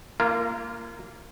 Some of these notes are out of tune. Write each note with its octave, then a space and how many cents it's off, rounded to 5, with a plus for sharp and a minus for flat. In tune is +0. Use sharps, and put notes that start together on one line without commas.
A#3 -5 F4 -35 A#4 +0